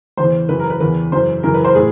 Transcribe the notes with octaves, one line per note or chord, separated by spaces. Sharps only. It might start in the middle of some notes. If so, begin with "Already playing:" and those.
E2 C#3 E3 C5
F#2 C#3 E3 B4
A#4
B4
E2 C#3 E3 B4
F#2 C#3 E3 C5
F#2 C#3 E3 A#4
B4
C5
A2 G#4